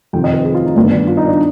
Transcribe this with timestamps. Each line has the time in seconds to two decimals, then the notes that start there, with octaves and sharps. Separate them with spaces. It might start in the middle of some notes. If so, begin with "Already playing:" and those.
0.13 F2 C3 D#3 G5
0.24 D#5
0.34 B4
0.45 G#4
0.55 F4
0.65 D#4
0.76 G2 D#3 B3 D4
0.91 D4
1.07 F4
1.17 D#4
1.27 D4